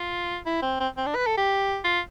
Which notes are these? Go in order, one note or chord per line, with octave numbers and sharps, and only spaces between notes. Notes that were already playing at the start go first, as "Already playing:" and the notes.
Already playing: F4
E4
C4
C4
C4
D4
B4
A4
G4
F4